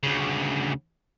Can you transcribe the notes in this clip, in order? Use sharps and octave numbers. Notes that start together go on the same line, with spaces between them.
D2 C#3